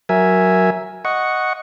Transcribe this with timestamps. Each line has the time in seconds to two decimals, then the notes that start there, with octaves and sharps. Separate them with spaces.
0.09 F#3 A#4 E5 G#5
1.05 D#5 F#5 C#6